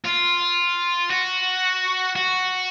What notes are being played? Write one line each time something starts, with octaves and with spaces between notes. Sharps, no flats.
F4
F#4
F#4